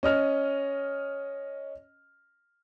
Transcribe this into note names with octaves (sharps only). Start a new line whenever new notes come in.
C#4 D#5 F6